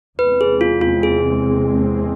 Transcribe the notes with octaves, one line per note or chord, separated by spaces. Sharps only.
E2 C3 G#3 C4 B4
G#4
F4
F4
G#4